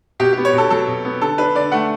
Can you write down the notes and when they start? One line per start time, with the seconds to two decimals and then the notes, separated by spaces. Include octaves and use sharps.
0.20 B2 G4
0.33 B3 G4
0.45 C#5
0.53 B2 A4
0.70 F#3 A4
0.87 B2
1.05 B3
1.21 D3 A4
1.38 D4 B4
1.55 D3 D5
1.72 A3 F#5